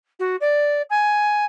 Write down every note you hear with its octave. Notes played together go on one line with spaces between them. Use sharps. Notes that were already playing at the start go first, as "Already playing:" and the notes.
F#4
D5
G#5